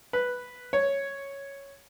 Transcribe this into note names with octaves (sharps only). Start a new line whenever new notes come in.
B4
C#5